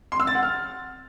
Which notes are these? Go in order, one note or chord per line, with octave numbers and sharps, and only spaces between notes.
C6
E6
A6
F#5
F6